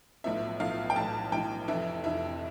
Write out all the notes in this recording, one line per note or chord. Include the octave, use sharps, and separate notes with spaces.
B1 A2 F3 B3 E5
B1 A2 F3 B3 F5
G5
B1 A2 E3 A5
B1 A2 E3 G5
F1 F2 E3 E5
F1 F2 E3 E5